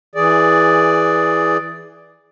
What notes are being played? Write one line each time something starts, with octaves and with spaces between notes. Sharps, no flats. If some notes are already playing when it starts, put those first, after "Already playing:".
E3 G#4 D5